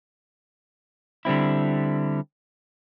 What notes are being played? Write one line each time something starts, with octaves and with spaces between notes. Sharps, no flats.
D3 G3 C4 E4